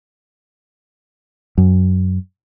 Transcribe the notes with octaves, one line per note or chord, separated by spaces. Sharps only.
F#2